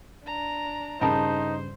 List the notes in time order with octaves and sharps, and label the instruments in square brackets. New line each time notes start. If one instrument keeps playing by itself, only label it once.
[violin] D4 A#5
[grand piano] G2 C#3 [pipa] B3 A#4 A5 [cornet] D#4 [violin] C5